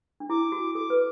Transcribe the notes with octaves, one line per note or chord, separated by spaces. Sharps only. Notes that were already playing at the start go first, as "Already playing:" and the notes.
D4
E4 D6
F#4
A4 D6
B4